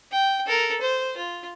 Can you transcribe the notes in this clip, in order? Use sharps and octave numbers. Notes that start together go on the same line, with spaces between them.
G5
A4 A#4
C5
F4